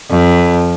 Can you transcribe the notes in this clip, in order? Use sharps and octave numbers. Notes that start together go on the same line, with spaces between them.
F2